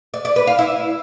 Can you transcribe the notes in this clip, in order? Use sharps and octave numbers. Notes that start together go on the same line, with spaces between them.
D5
D5
B4
F5
E4